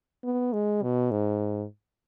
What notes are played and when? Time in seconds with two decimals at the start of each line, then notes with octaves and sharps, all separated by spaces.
0.24 B3
0.53 G#3
0.82 B2
1.11 G#2